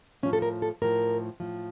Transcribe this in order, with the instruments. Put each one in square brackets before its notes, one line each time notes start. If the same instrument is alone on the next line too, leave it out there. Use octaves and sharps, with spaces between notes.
[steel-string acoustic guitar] A2 F3 C#4
A4
A#4
A4
A2 F3 A#4
A2 F3